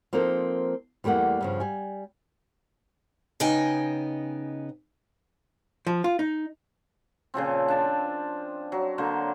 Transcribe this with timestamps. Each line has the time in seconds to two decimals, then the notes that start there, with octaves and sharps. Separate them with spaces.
0.13 F3 A#3 C4 D#4 A4 A#4
1.04 E2 G3 A3 A#3 F#5
1.41 G2 C#3 F3
1.60 G3 G#5
3.40 C#3 B3 D#4 D#5 G5 G#5
5.87 F3
6.04 F4
6.19 D#4
7.34 A#2 C#3 F3 C4
7.68 D4 A5
8.72 F#3
8.98 D3 A#3 C5